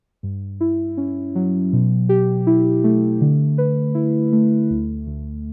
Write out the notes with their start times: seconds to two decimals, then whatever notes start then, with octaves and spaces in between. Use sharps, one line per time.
0.23 G2
0.61 E4
0.97 C#4
1.35 F#3
1.73 B2
2.09 G4
2.47 E4
2.84 A3
3.21 D3
3.58 B4
3.95 E4
4.32 A3
4.70 D2
5.07 D2